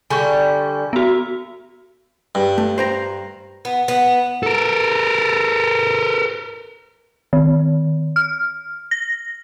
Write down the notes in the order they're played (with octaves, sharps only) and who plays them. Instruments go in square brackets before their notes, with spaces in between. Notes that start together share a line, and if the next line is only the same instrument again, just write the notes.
[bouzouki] D3 G3 [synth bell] G#5 C#6
[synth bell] B3 F#4
[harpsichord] G2
[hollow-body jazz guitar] A3
C5 G5 A#5
[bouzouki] B3
B3
[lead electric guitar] A4 A#4
[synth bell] D#3
F6
A#6